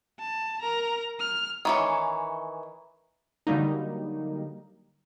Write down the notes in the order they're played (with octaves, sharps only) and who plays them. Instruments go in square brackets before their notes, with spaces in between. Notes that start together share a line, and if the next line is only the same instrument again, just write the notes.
[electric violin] A5
A#4 A#5
F6
[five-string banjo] D#3 E3 C#4
[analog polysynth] D3 F#3 G3 A#3 D#4